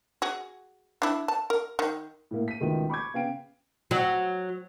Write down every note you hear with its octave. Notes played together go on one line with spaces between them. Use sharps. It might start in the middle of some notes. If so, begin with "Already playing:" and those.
F#4 G#4
D4 E4
A5
A#4
D#3
A2 A#3
B6 D#7
C#2 B2 D#3 A3 B3
B5 C#6 D6 G#6
C#3 B3 F5 G5 D7
F#3